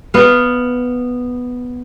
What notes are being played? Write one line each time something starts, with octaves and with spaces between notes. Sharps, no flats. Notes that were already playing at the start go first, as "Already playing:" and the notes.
B3 F5